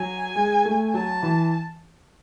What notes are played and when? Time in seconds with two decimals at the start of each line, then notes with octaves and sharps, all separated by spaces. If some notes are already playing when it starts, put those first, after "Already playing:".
Already playing: F#3 G#5
0.36 G#3
0.65 A3
0.94 F#3 A5
1.23 E3